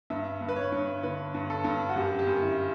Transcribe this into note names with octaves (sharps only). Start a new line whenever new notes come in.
G2 E5
G2
B4
C#5
G2
D3 B4
G2
A4
G2
F#4
F#2 G4
G4
F#2
E4